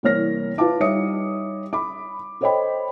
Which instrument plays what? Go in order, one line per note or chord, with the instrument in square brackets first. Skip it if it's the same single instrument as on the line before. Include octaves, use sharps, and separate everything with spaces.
[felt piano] C2 E3 A#3 C#5 F6 A#6
E4 F4 B4 F5 A5 D6
G3 D#4 C#5 E5 D#6 C#7
B5 D6
A4 C5 C#5 D#5 G5 B5